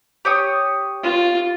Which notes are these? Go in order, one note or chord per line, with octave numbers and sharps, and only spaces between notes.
G4 C#5 D#6
F4